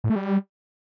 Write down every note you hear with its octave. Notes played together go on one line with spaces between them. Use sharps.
A2
A3
G3